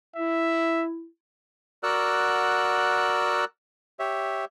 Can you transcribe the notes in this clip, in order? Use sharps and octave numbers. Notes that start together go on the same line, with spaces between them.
E4 E5
F#4 A#4 D5 F#5 E6 F#6
G4 C#5 E5